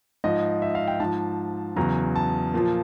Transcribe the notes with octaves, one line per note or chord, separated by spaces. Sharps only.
G#2 F3 D#5
E5
F5
G5
G#2 F3 A5
E2 C#3 F#3 A#5
A5
A#2 F3